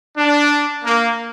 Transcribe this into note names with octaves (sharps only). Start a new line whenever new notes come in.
D4
A#3